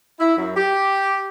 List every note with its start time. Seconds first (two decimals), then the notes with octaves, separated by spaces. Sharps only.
0.20 E4
0.37 F#2
0.56 G4